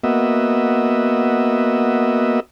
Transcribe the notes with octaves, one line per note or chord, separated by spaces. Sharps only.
A#3 B3 F#4 D#5 E5